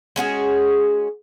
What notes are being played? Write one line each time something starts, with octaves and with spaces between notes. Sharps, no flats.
G#3 C#4 F#4 G#4